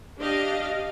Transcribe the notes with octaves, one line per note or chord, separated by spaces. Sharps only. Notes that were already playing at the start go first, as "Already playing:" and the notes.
D4 G4 D#5 F5